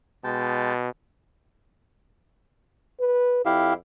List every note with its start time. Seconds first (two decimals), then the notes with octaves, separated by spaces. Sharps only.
0.24 B2 G#3 G5 A5
3.00 B4
3.46 F2 E4 G4 F5